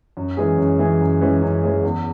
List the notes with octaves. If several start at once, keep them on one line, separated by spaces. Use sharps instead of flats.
F#2
E3 G#3 C#4 G#4
F#2
E3 G#3 C#4 G#4
F#2
E3 G#3 C#4 G#4
F#2
E3 G#3 C#4 G#4
E2